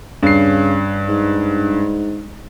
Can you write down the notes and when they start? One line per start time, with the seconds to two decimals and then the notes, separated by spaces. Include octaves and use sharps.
0.23 G2 C#3 C7
1.08 G#2